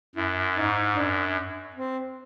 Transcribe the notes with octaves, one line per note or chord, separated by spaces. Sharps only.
F#2 E4
G#2 D#4
F#2 D4
C4